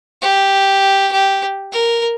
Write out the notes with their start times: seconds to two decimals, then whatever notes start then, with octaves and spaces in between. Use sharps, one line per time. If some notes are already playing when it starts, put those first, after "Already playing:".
0.22 G4
1.12 G4
1.72 A#4